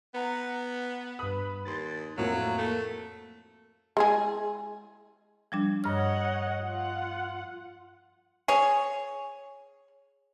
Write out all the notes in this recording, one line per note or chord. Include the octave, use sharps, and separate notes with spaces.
B3 B4 F#5 A#5
G2 B4 B5 D#6
D#2 C6 A6
F2 A2 F#3 A#3 A4
A3
G#3 E4 G#4
F3 G3 D4
G2 C#5 D#5 F#5 F6
F4 F#5
G#4 C#5